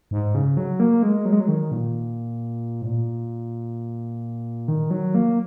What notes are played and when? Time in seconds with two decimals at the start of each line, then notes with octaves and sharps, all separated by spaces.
0.11 G#2
0.35 C#3
0.57 F#3
0.80 A#3
1.03 G#3
1.25 F#3
1.33 G#3
1.40 F#3
1.48 D#3
1.72 A#2
2.82 G#2
2.85 A#2
4.68 D#3
4.91 F#3
5.15 A#3